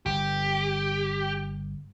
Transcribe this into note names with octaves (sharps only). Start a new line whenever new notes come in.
G1 G4